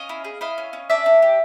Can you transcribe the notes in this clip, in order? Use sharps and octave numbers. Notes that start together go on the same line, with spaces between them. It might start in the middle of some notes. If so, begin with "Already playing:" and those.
Already playing: C#4 D#5 F5
E4
G#4
E4 D#5 F5
C#4
C#4
D4 D5 E5
D4
G4